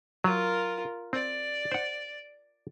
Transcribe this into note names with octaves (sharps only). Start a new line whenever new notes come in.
F#3 F4 A#4
C4 D5
C5 F#5